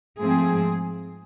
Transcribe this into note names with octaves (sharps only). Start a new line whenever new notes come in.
G#2 F3 A3 C4 G#4